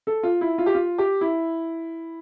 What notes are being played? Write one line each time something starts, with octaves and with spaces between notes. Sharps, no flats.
A4
F4
E4
F4
G4
F4
G4
E4